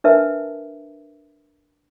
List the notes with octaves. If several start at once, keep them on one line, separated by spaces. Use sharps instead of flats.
D4 A#4 B4 E5 A5